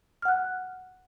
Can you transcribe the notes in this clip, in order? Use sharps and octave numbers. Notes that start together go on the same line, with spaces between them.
F#5 F6 F#6